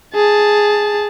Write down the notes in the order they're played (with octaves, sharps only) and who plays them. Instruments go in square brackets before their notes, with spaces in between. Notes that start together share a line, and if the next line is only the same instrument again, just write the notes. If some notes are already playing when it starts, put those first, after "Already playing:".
[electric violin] G#4 A5